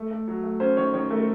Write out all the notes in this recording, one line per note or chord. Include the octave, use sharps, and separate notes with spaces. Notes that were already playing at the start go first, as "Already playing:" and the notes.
Already playing: A3
A3
F#3
A3
C#4 C5
D#3 C#5
D#3 C#5
A3 A#4
A4